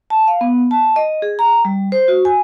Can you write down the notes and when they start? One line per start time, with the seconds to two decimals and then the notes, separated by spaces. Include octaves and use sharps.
0.10 A5
0.28 F5
0.41 B3
0.71 A5
0.96 D#5
1.22 G#4
1.39 A#5
1.65 G3
1.92 C5
2.08 F#4
2.25 G#5